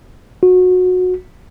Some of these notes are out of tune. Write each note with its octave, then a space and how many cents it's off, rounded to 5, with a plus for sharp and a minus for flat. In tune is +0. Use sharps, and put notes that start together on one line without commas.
F#4 -20